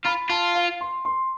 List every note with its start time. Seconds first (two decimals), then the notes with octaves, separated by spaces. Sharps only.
0.05 F4 B5
0.29 F4 A5
0.55 F5
0.81 C6
1.05 C6